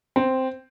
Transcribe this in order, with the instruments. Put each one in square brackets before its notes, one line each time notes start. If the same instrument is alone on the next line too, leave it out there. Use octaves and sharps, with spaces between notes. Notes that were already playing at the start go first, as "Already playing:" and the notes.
[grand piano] C4